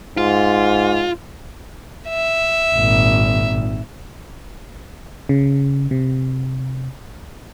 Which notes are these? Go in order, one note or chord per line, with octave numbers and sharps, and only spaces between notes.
G#2 F4
E5
G#1 A#2
C#3
C3